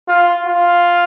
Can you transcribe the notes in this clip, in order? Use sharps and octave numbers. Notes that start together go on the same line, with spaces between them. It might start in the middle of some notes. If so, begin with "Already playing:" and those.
F4
F4